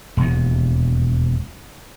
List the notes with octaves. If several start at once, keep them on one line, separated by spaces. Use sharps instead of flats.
E1 D#2